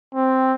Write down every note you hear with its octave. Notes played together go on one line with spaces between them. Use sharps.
C4